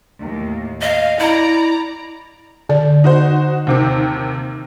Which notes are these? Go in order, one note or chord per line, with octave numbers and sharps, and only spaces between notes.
D#2 A2
D#5 F5
E4 D5 A#5
D3 D5
D#4 F#4 C5
D#2 C3 D#3